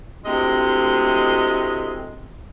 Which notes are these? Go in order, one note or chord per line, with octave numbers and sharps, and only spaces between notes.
D2 A2 C3 G#3 D#5